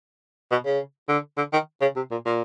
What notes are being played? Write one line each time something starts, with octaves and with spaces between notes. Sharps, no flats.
B2
C#3
D3
D3
D#3
C#3
C3
A#2
A#2